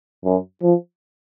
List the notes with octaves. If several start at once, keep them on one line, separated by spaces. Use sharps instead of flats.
F#2
F3